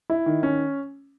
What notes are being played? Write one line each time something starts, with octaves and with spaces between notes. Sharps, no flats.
E4
D#3
C#4